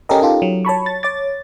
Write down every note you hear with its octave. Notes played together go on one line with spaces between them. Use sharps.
C#4 G4 A4 A#4 D#5
D#4 F4 G4 A4
F#3
C#5 A5 B5 C#6
A6
C#5 D6 A6